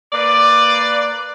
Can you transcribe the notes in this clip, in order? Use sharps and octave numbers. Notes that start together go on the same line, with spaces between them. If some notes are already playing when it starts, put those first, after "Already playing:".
A#3 B4 D5